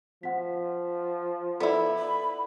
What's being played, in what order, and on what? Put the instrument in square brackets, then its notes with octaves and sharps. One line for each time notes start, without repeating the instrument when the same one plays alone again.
[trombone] F3 [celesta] F#5 B6
[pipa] B3 E4 [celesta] A4 D5
[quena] B5